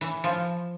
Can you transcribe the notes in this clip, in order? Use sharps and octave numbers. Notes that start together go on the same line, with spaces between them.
E3
F3